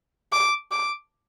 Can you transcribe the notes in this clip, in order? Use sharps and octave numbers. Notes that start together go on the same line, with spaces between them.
D6
D6